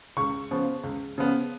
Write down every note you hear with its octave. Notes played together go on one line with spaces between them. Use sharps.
C#2 C#6
C#3 F3 B3
C#2
C#3 F3 B3